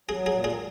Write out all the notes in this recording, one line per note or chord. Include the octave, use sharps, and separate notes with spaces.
F#3 G#4
G#4
A#2
G#4